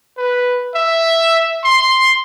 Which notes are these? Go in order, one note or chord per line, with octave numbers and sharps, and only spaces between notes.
B4
E5
C6